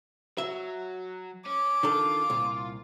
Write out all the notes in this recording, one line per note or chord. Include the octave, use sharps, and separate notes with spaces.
F#3 E5
C#4 D6
D#3 D4 F4 A4
C2 A#2